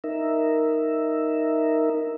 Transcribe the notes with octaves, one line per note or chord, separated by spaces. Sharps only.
D#4 A#4 E5